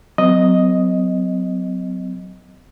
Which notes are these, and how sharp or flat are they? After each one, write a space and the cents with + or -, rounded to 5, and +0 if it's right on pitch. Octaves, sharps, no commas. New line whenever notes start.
F#3 +0 C4 -45 D#5 +0